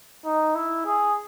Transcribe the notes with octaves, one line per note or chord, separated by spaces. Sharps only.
D#4
E4
G#4